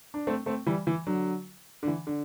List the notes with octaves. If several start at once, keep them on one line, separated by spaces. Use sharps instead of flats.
D4
A3 C4
A3 C4
E3 G3
E3
D3 F#3
D3
E3
D3